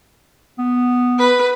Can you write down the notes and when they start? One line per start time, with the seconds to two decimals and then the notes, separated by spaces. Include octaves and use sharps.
0.59 B3
1.19 B4